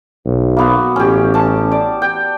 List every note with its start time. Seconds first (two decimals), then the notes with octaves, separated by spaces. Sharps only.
0.25 B1
0.57 A#3 B3 F#4
0.96 A1 C#4 G4
1.34 C#4 A5
1.72 D5
2.02 G5